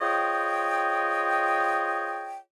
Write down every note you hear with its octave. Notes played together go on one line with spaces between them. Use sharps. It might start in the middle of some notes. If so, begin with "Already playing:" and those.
F4 G#4 C5 C#5 D#5 G5